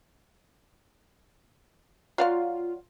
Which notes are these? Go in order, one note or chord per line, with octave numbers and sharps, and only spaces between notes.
F#3 F4 D5 F5